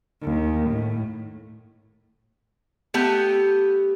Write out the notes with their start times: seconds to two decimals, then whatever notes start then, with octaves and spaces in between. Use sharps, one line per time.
0.22 D#2
0.70 A2
2.94 A3 B3 G4